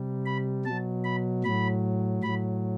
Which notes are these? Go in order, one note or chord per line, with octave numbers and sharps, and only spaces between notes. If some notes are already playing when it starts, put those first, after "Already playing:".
Already playing: C3 G3
B5
B2 F#3 A5
B5
A2 F#3 B5
A2 F#3 B5